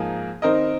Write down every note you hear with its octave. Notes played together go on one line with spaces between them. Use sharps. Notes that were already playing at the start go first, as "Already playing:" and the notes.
Already playing: G#2 F3 A#3 G#4
D#3 C4 D#4 A#4 D#5